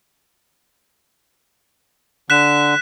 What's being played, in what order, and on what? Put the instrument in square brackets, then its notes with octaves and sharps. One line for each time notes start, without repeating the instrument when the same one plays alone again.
[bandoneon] D3 [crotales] F#6 B6 E7